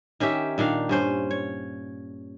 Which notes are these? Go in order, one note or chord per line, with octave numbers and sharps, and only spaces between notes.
D#3 C#4 G4 E5
A#2 D#3 D4 F5
G2 C#4 C5
C#5